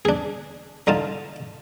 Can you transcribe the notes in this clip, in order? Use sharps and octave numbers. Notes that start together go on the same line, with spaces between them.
D4 G#4
D3 D#4 F4 A5